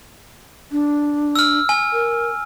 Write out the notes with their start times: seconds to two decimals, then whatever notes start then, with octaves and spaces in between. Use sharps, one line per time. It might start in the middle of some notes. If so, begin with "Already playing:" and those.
0.72 D4
1.35 E6 F6
1.69 G#5
1.93 A#4